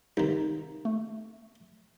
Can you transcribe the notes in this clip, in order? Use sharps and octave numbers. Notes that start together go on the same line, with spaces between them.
C2 D#3 D#4
A3